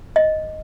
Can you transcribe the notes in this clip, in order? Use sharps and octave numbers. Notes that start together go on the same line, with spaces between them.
D#5